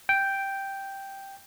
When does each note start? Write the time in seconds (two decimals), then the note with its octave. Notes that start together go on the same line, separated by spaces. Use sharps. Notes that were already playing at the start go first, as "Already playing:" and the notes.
0.09 G5